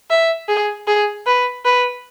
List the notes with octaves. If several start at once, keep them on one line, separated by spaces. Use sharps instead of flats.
E5
G#4
G#4
B4
B4